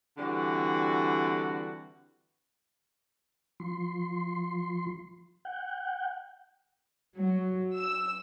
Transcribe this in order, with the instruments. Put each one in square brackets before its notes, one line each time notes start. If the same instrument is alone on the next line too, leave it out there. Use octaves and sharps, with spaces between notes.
[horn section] D3 E3 G3 C4 F#4
[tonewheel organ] F3 C6
F#5 G5
[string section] F#3
E6